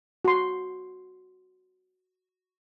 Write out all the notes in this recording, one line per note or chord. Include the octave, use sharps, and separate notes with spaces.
F#4 C6